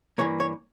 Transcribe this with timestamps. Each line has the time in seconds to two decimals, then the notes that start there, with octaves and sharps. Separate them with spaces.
0.18 G2 E3 A#3 C#5
0.40 C#5